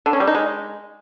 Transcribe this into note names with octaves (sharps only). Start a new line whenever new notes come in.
D3
C#4
G3
D#4
G#3